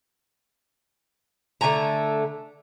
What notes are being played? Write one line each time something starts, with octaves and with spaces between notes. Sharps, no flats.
D3 A3 G#5 A#5